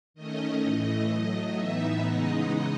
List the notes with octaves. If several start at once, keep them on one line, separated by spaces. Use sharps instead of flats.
D#3 A3 C#4 D#5
A2 E3 A3
A2 F#3 A3
A2 E3 B3 D#4 E5
C#3 E3 G#3 B3 D#4 D#5